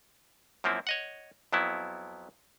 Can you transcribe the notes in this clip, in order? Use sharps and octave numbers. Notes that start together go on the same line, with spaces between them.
F#2 F3 A#3 C4 E4
C#5 D#5 F#5
F2 F3 F#3 B3 E4